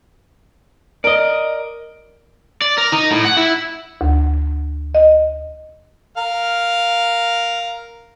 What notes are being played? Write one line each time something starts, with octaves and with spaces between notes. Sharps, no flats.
A#4 D5 D#5
D5
A#4
D#4
A2
F#5
E4
D2
D#5
A#4 F5